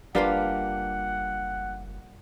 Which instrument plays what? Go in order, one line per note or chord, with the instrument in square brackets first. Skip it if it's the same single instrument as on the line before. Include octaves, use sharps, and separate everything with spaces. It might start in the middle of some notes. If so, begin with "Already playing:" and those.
[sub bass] F#1 [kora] G3 A#3 F4 [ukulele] D4 B4 F5 [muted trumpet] F#5